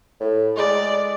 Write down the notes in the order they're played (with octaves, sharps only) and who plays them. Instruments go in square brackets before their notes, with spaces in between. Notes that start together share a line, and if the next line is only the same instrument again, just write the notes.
[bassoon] A2
[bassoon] G#3 [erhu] D5